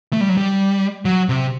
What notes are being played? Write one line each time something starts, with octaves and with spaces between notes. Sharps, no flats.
A3
G3
F#3
G3
F#3
C3